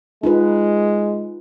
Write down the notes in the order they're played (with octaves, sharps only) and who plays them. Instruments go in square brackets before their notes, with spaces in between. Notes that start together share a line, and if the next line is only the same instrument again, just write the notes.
[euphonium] G#3 [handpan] D#4 F4 B4